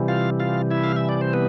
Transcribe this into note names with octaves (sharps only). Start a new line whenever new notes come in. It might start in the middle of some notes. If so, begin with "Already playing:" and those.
Already playing: C3 E3 G3
F4 F5
F4 F5
E4 E5
F5
E5
D5
C5
B3 B4